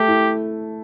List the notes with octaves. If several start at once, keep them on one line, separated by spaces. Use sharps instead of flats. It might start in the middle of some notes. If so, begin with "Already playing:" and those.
Already playing: A3 G4
E4